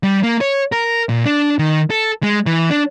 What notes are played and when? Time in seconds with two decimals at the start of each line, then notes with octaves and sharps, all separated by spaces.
0.04 G3
0.23 A#3
0.41 C#5
0.72 A#4
1.09 A#2
1.25 D4
1.59 D#3
1.91 A4
2.23 G#3
2.46 E3
2.70 D4